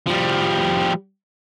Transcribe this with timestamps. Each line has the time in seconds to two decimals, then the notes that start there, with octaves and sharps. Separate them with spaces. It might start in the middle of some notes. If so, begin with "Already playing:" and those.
0.07 F3 G3